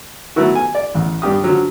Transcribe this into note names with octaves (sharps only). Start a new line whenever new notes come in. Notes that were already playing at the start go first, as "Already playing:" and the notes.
F#3 A3 B3 E4 F#4
G#5
D5
A1 E2
G2 D4 G4 D#6
D3 F3 F#3